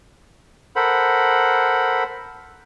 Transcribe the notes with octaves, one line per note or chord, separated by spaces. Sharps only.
A4 A#4 C5 F#5 B5